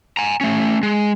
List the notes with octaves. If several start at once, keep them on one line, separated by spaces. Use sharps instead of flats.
G#5 A#5
A3 C#4
G#3